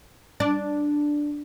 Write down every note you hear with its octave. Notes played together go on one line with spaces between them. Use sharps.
D4